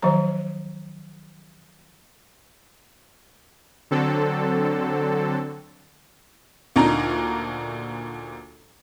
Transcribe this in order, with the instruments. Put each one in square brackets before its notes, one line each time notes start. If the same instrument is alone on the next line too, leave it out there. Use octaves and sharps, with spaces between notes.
[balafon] D#3 F3 F#3 C5 A#5
[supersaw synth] D3 F#3 C4 A4
[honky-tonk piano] D2 A#2 D4 D#4 A#5